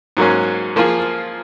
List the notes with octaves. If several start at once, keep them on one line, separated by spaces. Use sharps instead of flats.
G#2 F#3 A#3 C#4
F3 A#3 F4 G#4